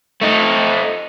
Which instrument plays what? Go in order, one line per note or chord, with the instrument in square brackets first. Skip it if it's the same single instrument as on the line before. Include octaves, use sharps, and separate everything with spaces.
[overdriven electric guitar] A3 D#4